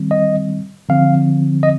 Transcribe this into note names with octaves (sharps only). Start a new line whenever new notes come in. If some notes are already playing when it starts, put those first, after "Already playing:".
Already playing: D#3 G3 C4
D#5
D3 F3 C4 F5
D#5